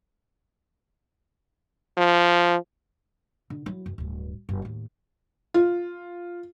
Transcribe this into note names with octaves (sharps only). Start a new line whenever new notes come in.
F3
D3
F#3 E4
F#1
D1 G2
F#1
D#2 A2
F4